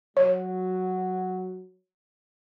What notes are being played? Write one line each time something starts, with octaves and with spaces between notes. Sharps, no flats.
F#3 C#5